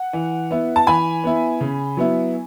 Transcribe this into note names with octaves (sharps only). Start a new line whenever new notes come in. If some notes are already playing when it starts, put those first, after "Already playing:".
Already playing: F#5
E3
B3 E4
A5
E3 G#5 B5
B3 E4
C#3
F#3 B3 E4